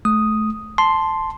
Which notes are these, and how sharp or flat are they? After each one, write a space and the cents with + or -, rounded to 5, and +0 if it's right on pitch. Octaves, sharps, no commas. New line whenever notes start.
A3 -25 D#6 +0
A5 +0 C6 +0